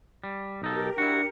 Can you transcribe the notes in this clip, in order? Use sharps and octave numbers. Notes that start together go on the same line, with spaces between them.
G3
B1 D#4 G4 A4 A#4
D4 E4 F#4 C#7